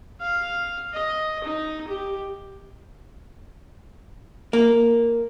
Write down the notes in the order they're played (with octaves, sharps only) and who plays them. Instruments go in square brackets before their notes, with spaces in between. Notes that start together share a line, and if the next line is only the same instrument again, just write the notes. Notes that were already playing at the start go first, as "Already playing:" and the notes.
[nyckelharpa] F5
D#5
D#4
G4
[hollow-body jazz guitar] A#3